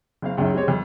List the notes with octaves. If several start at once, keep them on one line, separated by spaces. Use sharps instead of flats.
F#1 C4 F5
C#2 F#2 C#4 D#4 E4
G#3 C4 G4 C#5
G1 F2